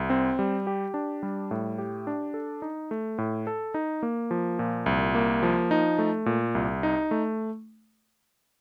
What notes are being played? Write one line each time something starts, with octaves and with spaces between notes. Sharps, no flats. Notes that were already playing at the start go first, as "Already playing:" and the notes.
Already playing: C2
C4
G3
G4
D4
G3
A2
G4
D4
A4
D#4
A3
A2
A4
D#4
A#3
F3
A#2
C2
A#3
F3
D#4
A3
A#2
C2
D#4
A3